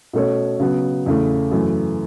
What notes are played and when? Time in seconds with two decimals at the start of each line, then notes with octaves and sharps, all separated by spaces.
0.13 B2 A3 C#4 A4 C#5
0.60 C#3 F#3 B3
1.06 E2 C#3 A3
1.51 F#2 E3 A3